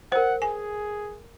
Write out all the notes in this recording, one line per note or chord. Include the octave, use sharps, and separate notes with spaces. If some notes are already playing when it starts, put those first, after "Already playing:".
A#4 C5 F#5 G5
G#4 G#5